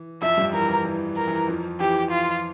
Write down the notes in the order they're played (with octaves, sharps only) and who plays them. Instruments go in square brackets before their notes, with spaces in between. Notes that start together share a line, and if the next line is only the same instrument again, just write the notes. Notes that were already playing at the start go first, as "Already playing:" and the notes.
Already playing: [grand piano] E3
[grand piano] F2 F3 [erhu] E5
[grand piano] G2 G3
[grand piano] E3 [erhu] A#4
[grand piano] E3
E3
[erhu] A#4
[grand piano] E3
F2 F3
[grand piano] E3 [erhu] G4
[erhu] F4